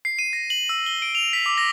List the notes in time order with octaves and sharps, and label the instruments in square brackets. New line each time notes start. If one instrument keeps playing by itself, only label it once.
[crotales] C7
D#7
A#6
F#7
E6
G7
D7
F7
B6
D6
A#6